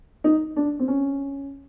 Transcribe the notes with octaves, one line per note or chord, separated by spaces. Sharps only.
D#4
D4
C4
C#4